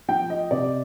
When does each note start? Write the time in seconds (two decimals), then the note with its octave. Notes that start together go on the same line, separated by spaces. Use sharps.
0.08 F3 G5
0.30 D#5
0.51 C3 D5